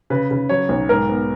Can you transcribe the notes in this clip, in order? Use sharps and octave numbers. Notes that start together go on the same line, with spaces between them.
C#3 B4
C#3
F#3 C#5
B1
G#2 A#4
B3